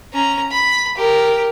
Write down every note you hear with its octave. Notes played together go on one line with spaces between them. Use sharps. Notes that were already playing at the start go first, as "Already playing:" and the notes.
C#4 A#5
B5
G4 A#4